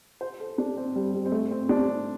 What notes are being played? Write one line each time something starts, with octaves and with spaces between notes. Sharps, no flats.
C5
A4
D4
C4
G3
G3
C4
A3
C4
D4